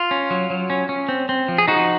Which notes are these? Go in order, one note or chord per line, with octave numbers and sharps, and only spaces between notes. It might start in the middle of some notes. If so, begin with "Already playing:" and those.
Already playing: F4
C#4
F#3
F#3
C#4
C#4
C4
C4
F3
G#4
F3 D#4 F#4